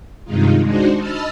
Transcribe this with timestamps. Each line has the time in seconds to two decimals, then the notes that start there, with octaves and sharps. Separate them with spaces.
0.24 G2 C3 D#3 G#3 D#4 F4
0.64 G#3 D4 D#4 F#4 C5
0.98 D#5 A5 B5 E6 F6 A6